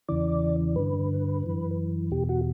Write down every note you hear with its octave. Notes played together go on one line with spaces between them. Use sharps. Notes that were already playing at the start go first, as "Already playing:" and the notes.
E2 C#3 E3 D5
G2 D3 B4
F#2 E3
E2 B2 G4
F#4